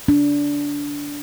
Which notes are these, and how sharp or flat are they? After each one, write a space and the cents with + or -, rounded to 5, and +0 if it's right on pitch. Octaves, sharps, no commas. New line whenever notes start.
D4 -20